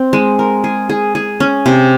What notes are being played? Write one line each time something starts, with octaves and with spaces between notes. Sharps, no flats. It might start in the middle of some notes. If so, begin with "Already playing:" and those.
Already playing: C4
G#3
A#4
G#4
G#4
G#4
C#4
C3